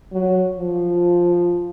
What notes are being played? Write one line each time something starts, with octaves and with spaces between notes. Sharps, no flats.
F#3
F3